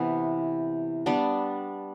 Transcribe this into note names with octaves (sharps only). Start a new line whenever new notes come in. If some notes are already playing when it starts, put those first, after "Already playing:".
Already playing: C3 E3 B3 E4
G3 B3 D4